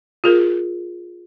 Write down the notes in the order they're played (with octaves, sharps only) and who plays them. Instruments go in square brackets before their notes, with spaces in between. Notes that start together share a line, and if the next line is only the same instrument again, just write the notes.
[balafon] F4 G#4 A#4